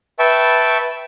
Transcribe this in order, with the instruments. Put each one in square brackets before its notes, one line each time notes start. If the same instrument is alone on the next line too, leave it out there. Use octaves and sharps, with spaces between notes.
[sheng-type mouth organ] B4 E5 G5 A5 C#6